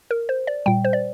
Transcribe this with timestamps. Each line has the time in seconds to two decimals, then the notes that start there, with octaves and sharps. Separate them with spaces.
0.11 A#4
0.29 C5
0.47 D5
0.66 A#2 G3 G5
0.85 C5
0.93 D5